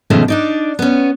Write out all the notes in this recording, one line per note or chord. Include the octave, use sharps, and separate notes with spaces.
B2 D#3 F3 G#3 A3 C#4
D4 D#4 D5
B3 C#4